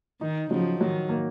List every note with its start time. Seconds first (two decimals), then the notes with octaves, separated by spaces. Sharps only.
0.21 D#3 D#4
0.51 C#3 F3 F#3
0.80 D#3 F#3
1.09 A#3